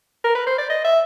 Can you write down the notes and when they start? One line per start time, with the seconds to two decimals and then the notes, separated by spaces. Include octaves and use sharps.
0.24 A#4
0.35 B4
0.47 C5
0.58 D5
0.70 D#5
0.85 E5